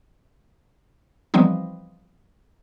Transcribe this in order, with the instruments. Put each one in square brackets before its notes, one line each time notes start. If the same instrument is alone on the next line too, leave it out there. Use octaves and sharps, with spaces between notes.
[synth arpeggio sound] E3 F3 G3 B3 C4 D#4